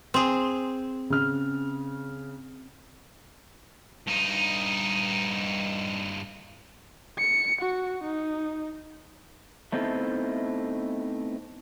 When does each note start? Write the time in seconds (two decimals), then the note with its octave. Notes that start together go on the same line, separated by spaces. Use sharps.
0.14 C4 G#4
1.10 C#3 F6
4.07 G2 D#4
7.18 C#7
7.61 F#4
8.04 D#4
9.72 A3 B3 C4 D#4 E4 A4